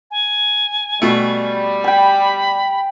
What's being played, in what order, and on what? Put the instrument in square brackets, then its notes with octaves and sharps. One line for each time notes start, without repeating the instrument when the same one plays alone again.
[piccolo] G#5
[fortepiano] B2 A3 [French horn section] G3
[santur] G5 G#5 [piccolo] B5